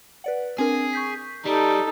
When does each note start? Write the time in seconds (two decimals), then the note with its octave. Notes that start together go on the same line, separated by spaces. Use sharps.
0.24 B4 D5 F#5
0.59 C4 D4 G#4 A#4
0.93 C#6 G6 B6
1.45 G3 D#4 A4